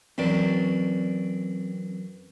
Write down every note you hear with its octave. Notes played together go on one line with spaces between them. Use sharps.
F#2 E3 C4 D5